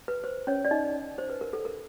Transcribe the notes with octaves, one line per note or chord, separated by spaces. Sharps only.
B4
C5
C#4 C#5
D5
D#4 D#5
C5
B4
A#4
A4
A#4